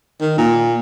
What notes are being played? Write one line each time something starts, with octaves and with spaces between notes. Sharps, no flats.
D#3
A#2